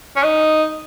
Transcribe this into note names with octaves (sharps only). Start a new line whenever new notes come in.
C#4
D#4